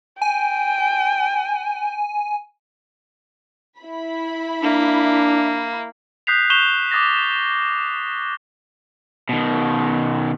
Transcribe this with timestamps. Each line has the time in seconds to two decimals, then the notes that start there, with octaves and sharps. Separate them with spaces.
0.22 G5 G#5
3.79 E4 B5
4.63 A#3 D4
6.27 D#6 F#6 G6 B6 C7 F7
6.50 C#6 F#6 G6 E7 F7 G7
6.91 D6 D#6 A6 A#6
9.29 B2 D#3